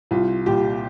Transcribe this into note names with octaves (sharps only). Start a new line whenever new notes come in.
C2 F4
A#2 G3 G4